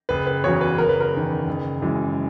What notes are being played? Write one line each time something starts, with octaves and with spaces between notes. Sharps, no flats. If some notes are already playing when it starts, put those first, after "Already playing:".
F#1 B4
B4
E2 C#3 F#3 C#5
B4
F#1 A#4
B4
A#4
E2 D#3
F#1
F#2 E3 G#3